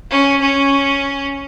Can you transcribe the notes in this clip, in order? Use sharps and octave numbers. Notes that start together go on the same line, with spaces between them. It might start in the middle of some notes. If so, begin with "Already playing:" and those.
C#4
C#4